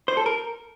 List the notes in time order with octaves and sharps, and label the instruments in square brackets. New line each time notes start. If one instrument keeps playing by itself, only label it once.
[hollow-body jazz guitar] C5
A4
A#4